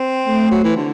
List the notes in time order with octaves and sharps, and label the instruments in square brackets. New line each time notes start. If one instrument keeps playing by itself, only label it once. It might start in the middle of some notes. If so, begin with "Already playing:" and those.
Already playing: [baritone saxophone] C4
[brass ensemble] A3
[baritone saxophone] F#3
E3
D3